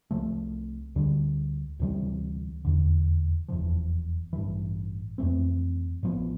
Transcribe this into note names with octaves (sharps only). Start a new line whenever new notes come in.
C2 C3 F3 A3
D2 D3 G3
D2 C3 E3 G3
F1 E2 D3
F1 E2 D3 F3
A1 G2 E3
F2 E3 A3 C4
A1 A2 F3 B3